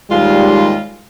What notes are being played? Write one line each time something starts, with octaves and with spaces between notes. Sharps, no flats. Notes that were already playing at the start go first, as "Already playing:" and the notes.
D#2 G#2 G3 G#3 F4